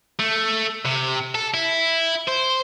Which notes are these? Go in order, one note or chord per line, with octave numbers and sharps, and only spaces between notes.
A3
C3
A4
E4
C5